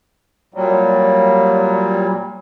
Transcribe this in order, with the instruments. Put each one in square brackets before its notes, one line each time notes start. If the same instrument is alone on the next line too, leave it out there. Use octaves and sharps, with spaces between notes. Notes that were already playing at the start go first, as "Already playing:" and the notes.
[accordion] A#2 F#3 G3